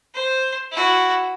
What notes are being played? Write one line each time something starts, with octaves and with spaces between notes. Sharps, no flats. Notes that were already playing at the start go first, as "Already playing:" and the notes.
C5
E4 F#4